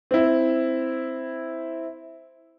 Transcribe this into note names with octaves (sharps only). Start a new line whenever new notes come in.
C4 E4